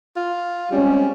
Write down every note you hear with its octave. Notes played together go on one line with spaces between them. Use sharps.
F4
G3 G#3 C4 C#4